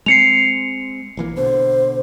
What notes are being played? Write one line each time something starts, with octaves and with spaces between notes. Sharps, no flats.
G#3 C4 C7 C#7 F7
A#1 E3 A#3
B2 D3 C5